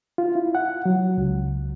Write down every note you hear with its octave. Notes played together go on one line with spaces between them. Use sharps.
F4
E4
F#5
F#3
C#2